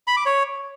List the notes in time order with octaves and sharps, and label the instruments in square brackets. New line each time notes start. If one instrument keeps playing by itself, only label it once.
[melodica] B5
D6
C#5